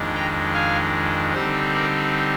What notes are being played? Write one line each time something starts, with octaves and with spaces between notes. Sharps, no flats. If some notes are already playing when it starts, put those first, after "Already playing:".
Already playing: F2 D#3 G#3 D4
G5 A#5
F5 G#5
D3 G3 C4 D#4 C5
A#4 D5